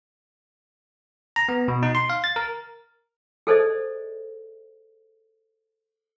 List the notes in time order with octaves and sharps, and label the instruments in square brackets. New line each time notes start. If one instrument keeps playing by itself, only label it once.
[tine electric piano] A#5
B3
B2
D#4
C6
F5
A6
A#4
[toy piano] G#4 A4 C5 D5 D#5